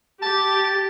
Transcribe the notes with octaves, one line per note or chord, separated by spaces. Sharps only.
G4 A5